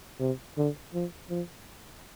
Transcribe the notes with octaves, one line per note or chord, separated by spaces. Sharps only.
C3
D3
F3
F3